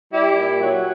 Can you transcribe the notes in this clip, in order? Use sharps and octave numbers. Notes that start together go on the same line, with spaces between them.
G3 E4 G4
A#2
F#3